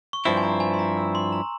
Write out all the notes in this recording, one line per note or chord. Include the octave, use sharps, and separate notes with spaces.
C#6
G2 F3 C4 E4 C6
G#5
A#5
G#5
C6
A#5
E6
C6
A#5